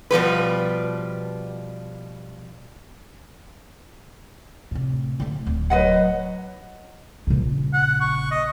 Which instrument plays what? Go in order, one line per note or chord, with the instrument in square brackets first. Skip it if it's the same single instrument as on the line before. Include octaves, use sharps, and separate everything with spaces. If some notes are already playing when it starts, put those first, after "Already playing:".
[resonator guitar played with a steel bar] B2 F3 G3 B4
[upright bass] A2 C3
D3 A3
D1
[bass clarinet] F#3 [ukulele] B4 D#5 F#5
[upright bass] A#1 C#3
[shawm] F#5
C#6
D#5